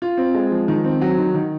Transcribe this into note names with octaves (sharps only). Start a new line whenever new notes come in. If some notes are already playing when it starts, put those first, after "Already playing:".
F4
C4
G#3
F3
D#3
C4
F#3
D#3
D#3